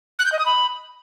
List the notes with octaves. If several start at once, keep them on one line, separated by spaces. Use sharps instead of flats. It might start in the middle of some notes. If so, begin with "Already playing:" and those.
F#6
G6
D#5
D#6
B5